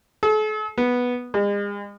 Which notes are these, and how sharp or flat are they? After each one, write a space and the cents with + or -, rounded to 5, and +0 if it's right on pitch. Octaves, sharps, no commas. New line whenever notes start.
A4 -45
B3 -5
G#3 -40